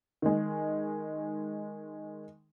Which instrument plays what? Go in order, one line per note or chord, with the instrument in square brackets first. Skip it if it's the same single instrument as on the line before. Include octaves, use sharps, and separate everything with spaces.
[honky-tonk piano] D#3 G#3